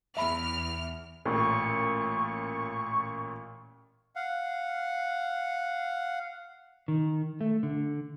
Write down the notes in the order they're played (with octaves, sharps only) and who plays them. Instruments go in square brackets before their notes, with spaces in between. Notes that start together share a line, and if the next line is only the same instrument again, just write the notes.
[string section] E2 F6 [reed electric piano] E5 B5
[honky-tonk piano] A1 A#2 [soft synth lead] C#6
[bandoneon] F5 F#5
[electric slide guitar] D#3
A3
D3